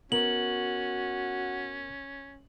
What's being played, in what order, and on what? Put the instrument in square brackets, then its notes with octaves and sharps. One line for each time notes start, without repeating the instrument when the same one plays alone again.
[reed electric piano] B3 A#4 [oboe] C#4 [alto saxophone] F#4 [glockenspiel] F#7